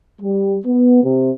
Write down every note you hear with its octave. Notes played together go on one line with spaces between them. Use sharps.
G3
B3
C3